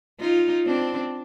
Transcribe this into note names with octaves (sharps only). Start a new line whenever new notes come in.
D#4 F4
C4 D4